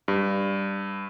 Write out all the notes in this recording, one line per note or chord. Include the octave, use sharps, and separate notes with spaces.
G2